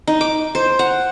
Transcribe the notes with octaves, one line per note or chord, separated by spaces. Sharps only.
D#4
D6
C5
F#5